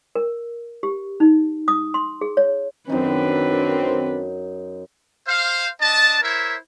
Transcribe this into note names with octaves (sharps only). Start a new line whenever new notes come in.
A#4
G4
D#4
D#6
C6
G#4
C#5
F#2 D#3 C4 D4 D#4 B4
C5 F5
D4 D#5 A5
E4 A#4 C5 C#5 E5